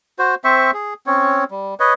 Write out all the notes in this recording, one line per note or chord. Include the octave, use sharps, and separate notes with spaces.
F#4 C5
C4 C5 E5 C#6
G#4
C4 C#4 C#5
G3
B4 C#5 D#5